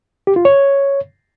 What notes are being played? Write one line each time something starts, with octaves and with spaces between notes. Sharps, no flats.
G4
F4
C#5